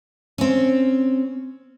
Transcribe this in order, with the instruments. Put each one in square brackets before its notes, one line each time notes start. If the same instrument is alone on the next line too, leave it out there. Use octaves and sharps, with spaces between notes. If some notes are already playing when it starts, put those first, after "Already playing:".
[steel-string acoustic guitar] C4 C#4